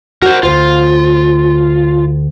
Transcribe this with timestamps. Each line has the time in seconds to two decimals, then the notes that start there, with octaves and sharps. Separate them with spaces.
0.22 F#4 A#4 C5
0.43 D2 F4 C5